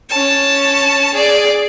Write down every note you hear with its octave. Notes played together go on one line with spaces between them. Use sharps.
C#4 A5
G#4 D5